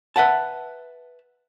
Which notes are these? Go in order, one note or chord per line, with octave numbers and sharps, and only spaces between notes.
B4 E5 F#5 A5